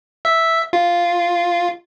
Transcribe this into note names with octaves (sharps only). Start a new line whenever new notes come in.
E5
F4